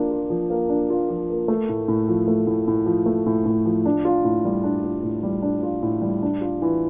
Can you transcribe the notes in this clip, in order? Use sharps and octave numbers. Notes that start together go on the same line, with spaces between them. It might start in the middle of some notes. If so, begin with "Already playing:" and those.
Already playing: F3 A#3 D4 F4
F4
F3
A#3
D4
F4
F3
A#3
A3
A2
A2
F3
A3
A2
A2
F3
A3
A2
A2
F3
D4
F4
A2
G3
D4
F4
A2
G3
D4
F4
A2
G3
D4
F4
E3